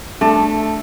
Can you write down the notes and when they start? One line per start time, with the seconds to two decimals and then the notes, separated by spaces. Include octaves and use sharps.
0.21 A3 D4